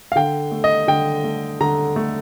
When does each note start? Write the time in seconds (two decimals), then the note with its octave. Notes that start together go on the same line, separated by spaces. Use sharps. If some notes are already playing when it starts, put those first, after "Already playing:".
0.12 F5
0.16 D3 G5
0.52 A3
0.64 D#5
0.88 D3 G5
1.24 A3
1.61 D3 A#5
1.96 A3